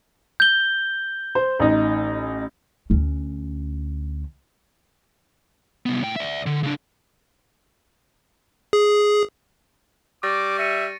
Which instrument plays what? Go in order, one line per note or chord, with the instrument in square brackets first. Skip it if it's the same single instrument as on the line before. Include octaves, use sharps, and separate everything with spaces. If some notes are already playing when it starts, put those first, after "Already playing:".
[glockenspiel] G6 G7
[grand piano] C5
A1 D#4
[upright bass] D2 C#4
[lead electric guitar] C2 B3
A2 G5
D5 E5
D3
C#3 D4
[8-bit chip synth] G#4
[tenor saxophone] G3 [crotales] C#6 A6 A#6 [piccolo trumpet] D6
[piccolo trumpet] E5 [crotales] A#6 C#7 D#7